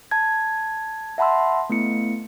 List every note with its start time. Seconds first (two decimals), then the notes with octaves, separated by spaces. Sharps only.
0.11 A5 G#6
1.18 E5 F#5 A5 B5 C6 E6
1.70 A3 B3 E4 C#7